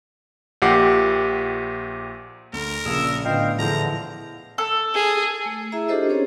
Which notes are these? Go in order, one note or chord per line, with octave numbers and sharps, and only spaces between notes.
A#1 A#2 G4 F#5 D6 C7
D2 A#4
A#1 A#2 C#3 G#4 E6 C#7
A2 D3 B3 F4 D#5 F5 G5
E2 A#2 D3 E3 F3 A#5 G6
A4
G#4
A3
E4 G#4 E5 A#5
D4 F4 G4 A4 C5 D#5
C4 C#4 G#4 C5 C#5